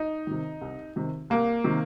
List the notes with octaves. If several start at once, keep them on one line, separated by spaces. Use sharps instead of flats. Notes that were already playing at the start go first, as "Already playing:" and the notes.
Already playing: D#4
C3 D#3
C2
C3 D#3
C2 A#3
C3 D#3